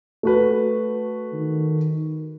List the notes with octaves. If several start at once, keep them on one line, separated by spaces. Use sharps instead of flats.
A3 F#4 B4
D#3